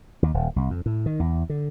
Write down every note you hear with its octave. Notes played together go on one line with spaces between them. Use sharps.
D#2
D#1
C2
F2
A2
D#3
E2
D3